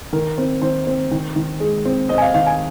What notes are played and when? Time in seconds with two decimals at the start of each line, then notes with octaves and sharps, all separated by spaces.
0.13 D#3 A#4
0.38 C4
0.62 D#3 C5
0.87 C4
1.11 D#3
1.36 D#3
1.60 G#3
1.85 C4
2.09 C4 D#5
2.18 G#5
2.22 F5
2.34 D#3 F5
2.47 G#5